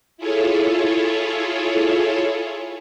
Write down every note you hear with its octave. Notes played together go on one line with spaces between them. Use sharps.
E4 F4 G#4 A4 C#5